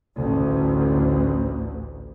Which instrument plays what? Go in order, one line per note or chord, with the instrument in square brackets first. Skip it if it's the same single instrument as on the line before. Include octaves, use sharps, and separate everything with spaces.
[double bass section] A1 D2